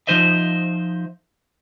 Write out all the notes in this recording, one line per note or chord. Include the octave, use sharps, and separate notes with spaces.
F3 B3 D#4 C5 D#5 E5